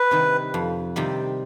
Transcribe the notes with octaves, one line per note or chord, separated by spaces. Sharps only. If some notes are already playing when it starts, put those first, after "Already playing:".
Already playing: B4
C3 D#3 G3
F2
C3 D#3 G3